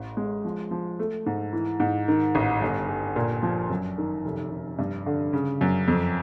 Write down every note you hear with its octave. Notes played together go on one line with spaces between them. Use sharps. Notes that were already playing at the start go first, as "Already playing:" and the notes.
Already playing: A1
G#3
F3
F3
A3
G#2
E3
G#2
D#3
A1
G1
G1
A#2
F3
F#2
D#3
F1
F1
G2
D3
C#3
F#2
F2